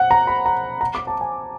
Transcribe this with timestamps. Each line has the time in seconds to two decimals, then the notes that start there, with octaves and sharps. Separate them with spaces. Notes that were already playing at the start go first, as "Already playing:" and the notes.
Already playing: F#5
0.11 A#5
0.27 B5
0.46 A#5
0.81 A#5
0.95 D6
1.07 A5
1.21 G#5